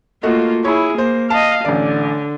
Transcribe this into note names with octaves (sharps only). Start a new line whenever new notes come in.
A3 A#3 F4 F#4 D#5
E4 G#4 C#5 B5
A#3 C5
D#5 F5 A5
A1 D3 D5